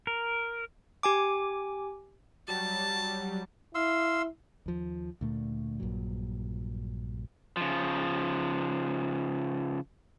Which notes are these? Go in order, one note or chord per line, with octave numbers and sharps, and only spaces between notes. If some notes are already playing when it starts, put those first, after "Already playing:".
A#4
G4 G#5 D6
F#3 G3 A5
E4 F5 C6 E6
D#2 F3
D2 A#2 A3
A#1 G2 A#2 F#3
C#3 F3